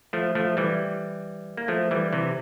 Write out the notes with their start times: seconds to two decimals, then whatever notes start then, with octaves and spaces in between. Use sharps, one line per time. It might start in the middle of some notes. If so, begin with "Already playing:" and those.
0.13 F3 A3
0.35 F3 A3
0.57 E3 G3
1.57 A#3
1.68 F3 A3
1.91 E3 G3
2.13 C3 E3